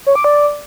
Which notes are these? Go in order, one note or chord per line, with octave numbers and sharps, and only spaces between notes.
C#5
D6
D5